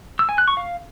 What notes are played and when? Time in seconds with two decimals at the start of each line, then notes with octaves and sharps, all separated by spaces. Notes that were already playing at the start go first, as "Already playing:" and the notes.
0.19 E6
0.29 G#5
0.38 F#6
0.48 C#6
0.57 F5